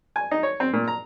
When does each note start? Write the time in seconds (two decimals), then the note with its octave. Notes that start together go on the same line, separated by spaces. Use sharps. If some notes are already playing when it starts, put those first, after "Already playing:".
0.16 G#5
0.31 D#4
0.43 C#5
0.60 C4
0.73 A#2
0.88 A#5